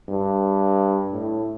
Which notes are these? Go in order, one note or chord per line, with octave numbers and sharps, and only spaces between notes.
G2
A2